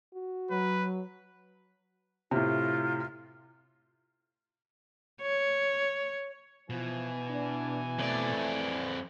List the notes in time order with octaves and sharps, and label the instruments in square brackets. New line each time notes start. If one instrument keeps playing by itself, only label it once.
[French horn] F#4
[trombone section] F#3 [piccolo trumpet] B4
[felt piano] A2 C3 [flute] F4
[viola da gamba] C#5
[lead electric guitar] B2 [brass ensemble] E3 G#5 [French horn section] F3
[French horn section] D4
[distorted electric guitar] F2 D5 [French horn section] A3